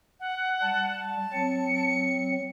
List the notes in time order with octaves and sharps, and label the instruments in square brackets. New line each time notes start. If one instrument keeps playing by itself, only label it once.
[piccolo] F#5
[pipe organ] G3 [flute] A5
[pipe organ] F#3 C4 [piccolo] C#7